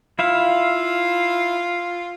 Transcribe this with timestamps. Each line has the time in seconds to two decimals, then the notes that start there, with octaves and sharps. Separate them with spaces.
0.19 E4 F4 E5 F5